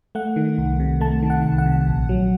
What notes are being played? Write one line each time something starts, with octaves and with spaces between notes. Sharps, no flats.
A3 F#5
D#3
C2
C3
A3 A5
D#3
F#5
C2
F#5
C3
A#1
F#3